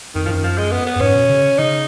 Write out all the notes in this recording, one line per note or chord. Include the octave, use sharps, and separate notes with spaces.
F2 D#3
F3
F#2 D#3
F3
G#3
B3
B3
F#2
G#2 C#4
B2
C#3
C#3 D#4